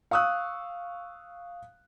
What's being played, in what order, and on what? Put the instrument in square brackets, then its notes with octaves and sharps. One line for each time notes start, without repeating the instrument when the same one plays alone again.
[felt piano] F5 C#6 D#6 E6 F#6